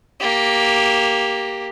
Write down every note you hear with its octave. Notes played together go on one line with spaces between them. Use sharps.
A#3 G4